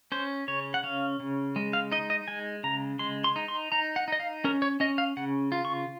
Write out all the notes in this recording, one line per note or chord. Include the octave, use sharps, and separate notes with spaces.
C#4 C5
C#3 C#5
F#5
C#4 F5
C#3
G#3
F5
D#4 D#5
D#5
G#3 G#5
C#3 A#5
G#3 C6
C6
D#4
C6
D#4 A#5
F#5
D#4 D#5
F5
C#4 A#4
C#5
C#4 D#5
F5
C#3 F#5
F4
C#6